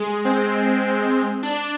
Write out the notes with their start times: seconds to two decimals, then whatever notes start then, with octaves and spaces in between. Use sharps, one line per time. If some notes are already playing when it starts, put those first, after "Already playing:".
Already playing: G#3
0.25 C4
1.43 D4